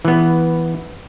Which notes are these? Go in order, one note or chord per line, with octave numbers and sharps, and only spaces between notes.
E3 B3